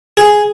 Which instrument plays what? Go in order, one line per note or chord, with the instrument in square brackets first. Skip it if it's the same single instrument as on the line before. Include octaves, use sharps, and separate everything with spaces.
[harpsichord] G#4